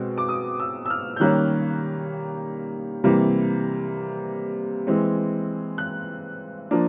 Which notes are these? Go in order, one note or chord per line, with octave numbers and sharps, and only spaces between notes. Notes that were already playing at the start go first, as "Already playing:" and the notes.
Already playing: B2 G#3 C4
D6
D#6
E6
E6
F6
G6
D#3 G3 A#3 C#4 F#6
C3 E3 G3 A#3
E3 G#3 C4
F#6
F3 A#3 D4